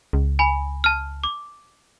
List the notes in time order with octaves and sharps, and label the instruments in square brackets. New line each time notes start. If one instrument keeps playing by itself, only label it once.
[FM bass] C#2
[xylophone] G#5 B5
A5 F6
D6